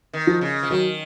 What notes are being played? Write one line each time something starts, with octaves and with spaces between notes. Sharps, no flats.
D#3
F3
C#3
F3
D#3 F#3